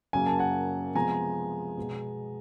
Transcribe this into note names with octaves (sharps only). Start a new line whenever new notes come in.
F#2 C#3 F#3 A#3 G#5
A5
F#5 G#5
C3 F3 G#3 B3 G#5 A#5
B2 G#3 B3